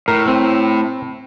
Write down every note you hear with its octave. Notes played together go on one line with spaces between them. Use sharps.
A2 A#4
C4